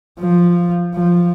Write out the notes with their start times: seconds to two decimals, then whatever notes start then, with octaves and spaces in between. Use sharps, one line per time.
0.19 F3
0.95 F3